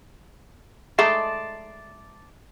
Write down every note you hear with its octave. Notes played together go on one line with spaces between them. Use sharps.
G#3 A3 D#4 D5 A5 C6